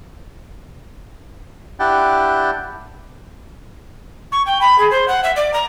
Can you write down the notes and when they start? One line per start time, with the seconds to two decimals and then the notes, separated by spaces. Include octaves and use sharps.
1.80 D4 E4 G4 D5 F#5 G5
4.32 C#6
4.46 G5
4.61 B5
4.78 G#4
4.90 C5
5.08 F#5
5.23 E5
5.36 D5
5.53 A#5